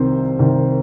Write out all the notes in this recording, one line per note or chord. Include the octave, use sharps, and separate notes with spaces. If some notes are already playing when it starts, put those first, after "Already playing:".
Already playing: C2 C3 D#3 C5
C2 C3 D#3